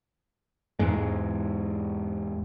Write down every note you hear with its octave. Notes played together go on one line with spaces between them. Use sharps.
E2 G#2 G#3